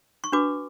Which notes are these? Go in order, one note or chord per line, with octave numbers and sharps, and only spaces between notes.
C#6
D4 F#4 B4 D6